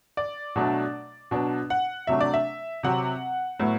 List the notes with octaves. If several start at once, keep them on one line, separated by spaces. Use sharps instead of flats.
D5
B2 F#3 A3 D4
B2 F#3 B3 D4
F#5
C3 F#3 A3 D4 E5
D5
E5
C3 F#3 C4 F#5
A2 F#3 B3